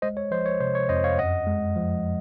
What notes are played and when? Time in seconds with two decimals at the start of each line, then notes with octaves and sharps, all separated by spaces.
0.02 G#3 C5 D#5
0.17 C#5
0.31 F3 C5 D#5
0.46 C#5
0.60 C3 C5
0.75 C#5
0.89 F2 C5 D#5
1.04 C#5 F5
1.18 F#2 D#5 F#5
1.47 G#3
1.76 F3